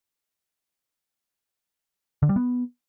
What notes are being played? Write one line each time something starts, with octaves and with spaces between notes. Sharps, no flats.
D3
G3
B3